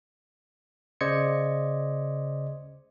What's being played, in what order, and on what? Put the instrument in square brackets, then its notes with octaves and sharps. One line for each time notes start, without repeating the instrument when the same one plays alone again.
[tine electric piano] C#3 C5 D5 D#5 G#6 C#7